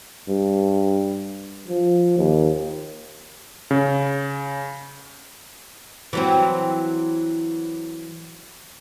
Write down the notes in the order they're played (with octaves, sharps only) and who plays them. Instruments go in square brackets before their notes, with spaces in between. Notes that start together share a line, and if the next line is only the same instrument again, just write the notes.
[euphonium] G2
F3
D#2
[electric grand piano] C#3
[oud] E3 F#3 C4